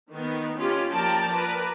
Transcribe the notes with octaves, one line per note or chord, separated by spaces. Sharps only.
D#3 B3
C#4 F4 G4
F3 A#3 A#4 D5 G5 A5
A#4 B4 D5